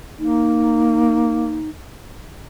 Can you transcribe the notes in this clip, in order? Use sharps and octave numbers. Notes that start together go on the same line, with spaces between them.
A#3 D#4